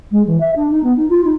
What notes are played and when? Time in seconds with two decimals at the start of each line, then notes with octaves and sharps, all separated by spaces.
0.11 G#3
0.26 E3
0.40 E5
0.55 D4
0.70 D#4
0.83 B3
0.96 D#4
1.09 F4
1.24 D#4